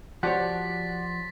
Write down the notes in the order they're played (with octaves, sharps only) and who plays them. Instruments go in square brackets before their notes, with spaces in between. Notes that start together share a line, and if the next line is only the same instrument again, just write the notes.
[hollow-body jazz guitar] F3 G4 C#5 [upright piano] F#4 D5 [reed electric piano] F#5 [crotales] A6 B6